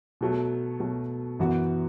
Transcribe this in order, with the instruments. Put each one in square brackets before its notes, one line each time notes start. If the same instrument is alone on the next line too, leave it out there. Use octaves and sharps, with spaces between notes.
[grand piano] B2 F#3 A3
B2 F#3 A3
F#2 E3 B3 F#4